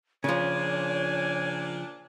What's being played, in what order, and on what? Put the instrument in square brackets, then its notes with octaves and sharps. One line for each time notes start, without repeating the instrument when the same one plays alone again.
[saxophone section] A#2 D4 [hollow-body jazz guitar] C#3 F3 [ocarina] C#5 [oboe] G#5